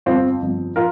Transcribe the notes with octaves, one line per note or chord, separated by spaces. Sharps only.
G1 F2 F3 C4 F4
G1 F2 F3
F3 F4 A#4